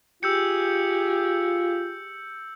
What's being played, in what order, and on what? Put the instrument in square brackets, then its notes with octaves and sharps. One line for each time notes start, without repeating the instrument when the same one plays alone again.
[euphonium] F4 [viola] G4 G#4 [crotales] E6 G6 C#7